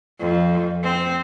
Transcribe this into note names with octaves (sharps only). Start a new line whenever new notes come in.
F2
C4